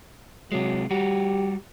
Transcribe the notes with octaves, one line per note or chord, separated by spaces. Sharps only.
C3 F#3 G#3
G3 F#4 G4